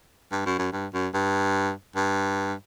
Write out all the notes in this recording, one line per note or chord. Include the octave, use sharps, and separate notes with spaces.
G2
F#2
F#2
G2
F#2
G2
G2